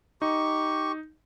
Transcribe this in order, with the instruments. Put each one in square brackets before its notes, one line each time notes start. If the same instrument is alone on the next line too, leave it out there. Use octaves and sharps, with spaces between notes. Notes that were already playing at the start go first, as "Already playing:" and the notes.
[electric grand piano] D#4 [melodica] G4 C#6